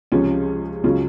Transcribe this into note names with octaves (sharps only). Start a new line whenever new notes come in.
C#2 C3 F3 C#4 F4
C#2 C#3 F#3 C#4 F4